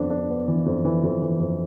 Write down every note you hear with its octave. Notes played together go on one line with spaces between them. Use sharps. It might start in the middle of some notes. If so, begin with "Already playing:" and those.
Already playing: F2 B3 D4
D4
B3
E3
F2
E3
F2
E3
F2